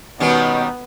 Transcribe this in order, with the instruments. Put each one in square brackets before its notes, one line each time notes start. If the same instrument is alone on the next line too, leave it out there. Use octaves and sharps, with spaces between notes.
[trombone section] B2 [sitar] D#3 G3 C#4 [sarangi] B3